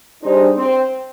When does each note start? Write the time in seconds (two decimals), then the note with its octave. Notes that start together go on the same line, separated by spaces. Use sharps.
0.23 G3 D4 D#4 G#4 C5
0.58 C4